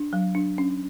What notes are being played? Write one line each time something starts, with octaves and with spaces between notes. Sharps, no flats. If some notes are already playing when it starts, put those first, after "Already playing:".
Already playing: D4
F#3
D4
C#4